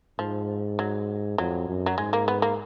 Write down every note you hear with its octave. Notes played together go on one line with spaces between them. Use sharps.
G#2 F3
F#3
F2 F#3
F#2
F#3
G#2 G#3
A#3
B3
A#3